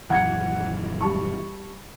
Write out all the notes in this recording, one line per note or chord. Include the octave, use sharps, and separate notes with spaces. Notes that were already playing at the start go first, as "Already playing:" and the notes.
D#1 F#2 E3 F#5 G#6 C#7
G3 A5 C#6